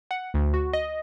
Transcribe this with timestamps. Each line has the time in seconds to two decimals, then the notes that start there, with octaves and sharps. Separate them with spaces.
0.11 F#5
0.34 D2
0.54 F#4
0.73 D#5